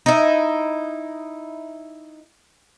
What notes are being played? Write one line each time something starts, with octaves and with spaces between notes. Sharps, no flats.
D#4 E4